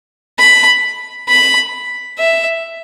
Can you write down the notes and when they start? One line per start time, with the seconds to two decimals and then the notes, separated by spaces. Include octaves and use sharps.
0.39 B5
1.29 B5
2.18 E5